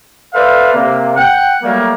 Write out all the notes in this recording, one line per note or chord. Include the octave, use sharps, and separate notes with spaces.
A4 B4 C5 D5 E5 F5
C3 A#3
F#5 G5
F#3 G3 A3 A#3